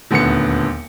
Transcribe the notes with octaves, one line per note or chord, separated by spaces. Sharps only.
D#1 D2 D3 B3 C#7